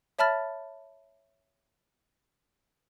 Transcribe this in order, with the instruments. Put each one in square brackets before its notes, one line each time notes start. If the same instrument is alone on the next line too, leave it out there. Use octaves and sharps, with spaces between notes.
[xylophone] C#5 E5 A5 B5 F6 A6